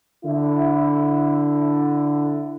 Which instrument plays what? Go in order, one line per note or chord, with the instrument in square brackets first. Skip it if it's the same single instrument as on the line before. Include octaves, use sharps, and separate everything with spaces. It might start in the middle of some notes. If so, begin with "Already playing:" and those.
[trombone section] D3 E4